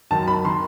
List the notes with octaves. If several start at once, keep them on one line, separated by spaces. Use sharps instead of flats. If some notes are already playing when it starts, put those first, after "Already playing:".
F#2 D#3 A5
B5
D#3 C6